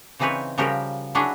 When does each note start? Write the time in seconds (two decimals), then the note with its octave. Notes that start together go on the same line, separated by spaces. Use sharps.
0.19 C#3 E3 C4 D#4 B4 C#5
0.58 C#3 F3 G3 F#4 G4 A#4
1.15 F#3 D4 E4 F#4 G#4